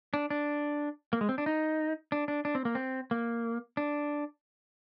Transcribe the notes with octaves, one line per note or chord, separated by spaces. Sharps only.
D4
D4
A#3
G#3
C4
D4
D#4
D4
D4
D4
C4
A#3
C4
A#3
D4